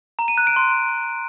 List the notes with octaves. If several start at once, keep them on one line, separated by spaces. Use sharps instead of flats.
A#5
D#7
F#6
D7
C6